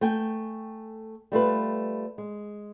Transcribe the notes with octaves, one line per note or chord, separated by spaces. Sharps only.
A3 G5 G#5
G3 A3 F4 B4
G#3